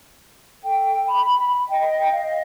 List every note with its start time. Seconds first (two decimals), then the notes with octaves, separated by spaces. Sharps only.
0.63 A4 G5
1.09 B5
1.69 D#5 G5
2.12 D#5 F5